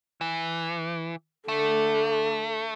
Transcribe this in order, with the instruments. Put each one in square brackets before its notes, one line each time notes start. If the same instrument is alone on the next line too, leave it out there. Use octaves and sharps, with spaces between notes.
[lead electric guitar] E3
[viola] D3 [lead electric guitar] A3